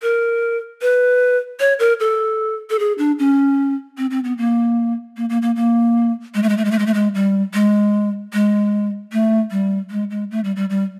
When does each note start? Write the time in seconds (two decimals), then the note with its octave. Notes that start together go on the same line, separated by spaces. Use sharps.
0.02 A#4
0.82 B4
1.60 C#5
1.79 A#4
2.00 A4
2.70 A4
2.79 G#4
2.98 D4
3.19 C#4
3.98 C4
4.11 C4
4.24 B3
4.38 A#3
5.17 A#3
5.29 A#3
5.42 A#3
5.56 A#3
6.35 G#3
6.43 A3
6.49 G#3
6.58 A3
6.65 G#3
6.71 A3
6.79 G#3
6.86 A3
6.94 G#3
7.15 G3
7.54 G#3
8.33 G#3
9.12 A3
9.51 G3
9.90 G#3
10.10 G#3
10.31 A3
10.44 G3
10.56 G3
10.70 G3